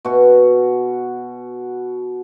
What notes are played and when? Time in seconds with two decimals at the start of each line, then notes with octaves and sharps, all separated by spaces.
0.05 B2 F#4